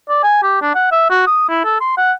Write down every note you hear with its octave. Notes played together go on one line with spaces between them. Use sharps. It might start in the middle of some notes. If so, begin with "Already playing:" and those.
D5
G#5
G4
D4
F#5
E5
F#4
D#6
E4
A4
C6
F#5